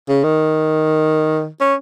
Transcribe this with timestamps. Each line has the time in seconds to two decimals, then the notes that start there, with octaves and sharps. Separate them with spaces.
0.09 C#3
0.24 D#3
1.60 C#4